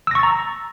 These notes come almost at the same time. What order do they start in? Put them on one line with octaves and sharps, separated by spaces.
E6 A#6 C#6 A6 A#5